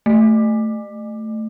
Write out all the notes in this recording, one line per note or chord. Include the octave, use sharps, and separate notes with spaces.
A3